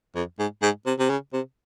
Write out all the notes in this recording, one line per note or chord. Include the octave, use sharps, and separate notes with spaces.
F2
G#2
G#2
C3
C3
C#3
C3